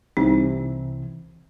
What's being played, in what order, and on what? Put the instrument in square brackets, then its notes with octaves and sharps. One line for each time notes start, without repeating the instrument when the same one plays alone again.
[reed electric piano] C2 C3 E3 [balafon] D#4